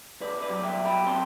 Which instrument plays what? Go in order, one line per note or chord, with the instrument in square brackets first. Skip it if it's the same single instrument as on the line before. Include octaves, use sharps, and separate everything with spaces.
[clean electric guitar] C2 B4 D5
B4 D5
F#3
E5 G5
B2
G5 B5
C4 A5 C6